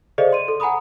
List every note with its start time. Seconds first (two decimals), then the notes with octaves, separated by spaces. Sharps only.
0.18 G#4 A4 C5 D5 D#5 F5
0.32 C6 D#7
0.48 A4
0.60 F#5 G#5 A#5 B5 D#6